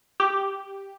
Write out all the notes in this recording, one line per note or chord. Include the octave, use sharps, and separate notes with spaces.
G4